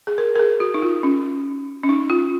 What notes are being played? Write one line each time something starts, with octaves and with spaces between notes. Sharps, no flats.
G#4
A#4
A#4
G#4
F#4
D#4
F4
C#4
C#4
D#4
F4